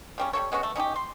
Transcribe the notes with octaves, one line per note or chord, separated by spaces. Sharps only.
C#3 G3 C#4
G3 A#3 A4 C#5
G#3 B3 C#4 F#4
A3
C#4 D#4 F#4 G4
C6